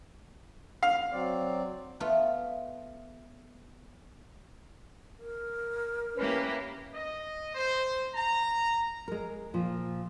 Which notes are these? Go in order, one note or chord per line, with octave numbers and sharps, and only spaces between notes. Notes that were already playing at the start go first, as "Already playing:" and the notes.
F5
F#3 C4 D5
A3 B3 F4
A#4
A#3 C#4 E4 G4 B4
D#5
C5
A#5
G#3 A#4
A#2 F3